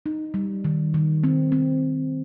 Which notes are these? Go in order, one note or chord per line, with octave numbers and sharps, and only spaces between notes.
D#4
G3
D#3
D#3
C4
C4